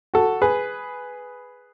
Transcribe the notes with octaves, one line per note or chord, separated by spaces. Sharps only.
F#4 A4
G#4 B4